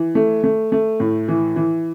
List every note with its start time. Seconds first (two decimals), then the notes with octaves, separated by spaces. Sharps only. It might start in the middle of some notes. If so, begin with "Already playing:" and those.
Already playing: E3
0.15 A3
0.44 A3
0.72 A3
1.00 A2
1.28 E3
1.56 E3